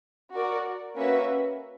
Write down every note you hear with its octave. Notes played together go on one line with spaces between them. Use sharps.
F#4 A#4 D5
A#3 C#4 F#4 B4 E5